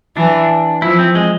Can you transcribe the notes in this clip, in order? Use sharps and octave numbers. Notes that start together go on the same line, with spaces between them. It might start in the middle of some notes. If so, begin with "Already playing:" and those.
E3 D4
F3 E4
C4
G#3